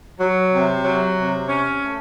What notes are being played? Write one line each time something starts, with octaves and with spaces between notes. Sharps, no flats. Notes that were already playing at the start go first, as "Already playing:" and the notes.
F#3
C3
F#3
C3
C#4
A3